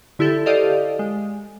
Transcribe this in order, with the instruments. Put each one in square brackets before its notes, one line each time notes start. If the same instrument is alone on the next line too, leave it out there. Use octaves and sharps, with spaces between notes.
[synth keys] D3 E4 G4 A4
G4 A4 C5 D5 D#5 F5
G#3